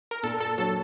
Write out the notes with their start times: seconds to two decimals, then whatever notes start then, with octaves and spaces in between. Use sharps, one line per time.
0.11 A#4
0.23 A#2 A4
0.40 A4
0.58 F#3 A4